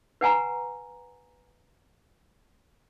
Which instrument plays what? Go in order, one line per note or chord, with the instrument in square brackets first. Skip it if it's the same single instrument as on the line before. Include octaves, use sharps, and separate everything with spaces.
[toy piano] B4 F#5 G#5 A#5